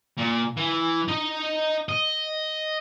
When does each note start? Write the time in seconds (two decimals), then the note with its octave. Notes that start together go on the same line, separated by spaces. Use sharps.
0.17 A#2
0.57 E3
1.08 D#4 D#5
1.89 D#5